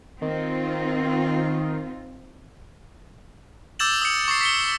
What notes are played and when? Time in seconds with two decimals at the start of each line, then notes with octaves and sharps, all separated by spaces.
0.22 D#3 C4 D#4 F4
3.79 D6 E6 G6 A6 E7 F#7
4.02 D#6 C#7
4.28 C#6 A6 C7
4.41 B6 C#7 G7